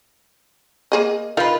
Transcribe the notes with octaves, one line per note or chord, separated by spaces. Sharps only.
A#3 G#4 D#5
D#4 F4 A#4 B4 F5